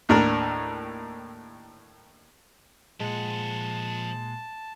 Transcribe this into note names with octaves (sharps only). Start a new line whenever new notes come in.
D#2 A2 D4 A#4
A#2 F3 G#3 F#5 A5